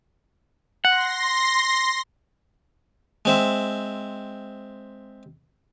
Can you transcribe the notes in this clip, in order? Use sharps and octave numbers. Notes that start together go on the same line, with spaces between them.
F#5 C6 A#6
G#3 C4 E5